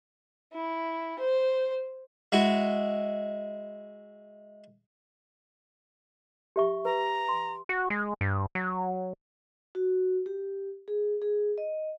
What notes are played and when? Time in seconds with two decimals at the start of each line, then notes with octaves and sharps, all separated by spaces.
0.53 E4
1.19 C5
2.32 G#3 E4 F#4
6.56 G4 E5 C#6
6.85 B4 A#5
7.29 C6
7.69 F#4
7.90 G#3
8.21 G2
8.55 F#3
9.75 F#4
10.26 G4
10.88 G#4
11.22 G#4
11.58 D#5